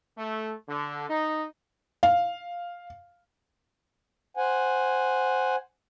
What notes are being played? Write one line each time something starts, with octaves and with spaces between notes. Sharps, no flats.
A3
D3
D#4
F5
C5 F#5 G#5